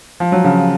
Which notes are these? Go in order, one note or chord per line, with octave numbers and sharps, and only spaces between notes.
F3
F#3
C#3 F3